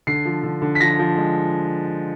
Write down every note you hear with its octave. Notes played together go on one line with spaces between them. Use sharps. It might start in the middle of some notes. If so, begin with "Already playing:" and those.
D3 C7
F3
D3
D3
B6
F3 A#6
F3
G#3